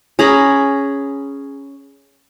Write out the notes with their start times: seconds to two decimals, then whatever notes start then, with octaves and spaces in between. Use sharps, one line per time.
0.19 C#4 G#4 A#5 B5